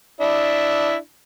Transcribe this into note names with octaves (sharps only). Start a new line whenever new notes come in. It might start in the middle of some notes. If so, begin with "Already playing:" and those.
D4 E4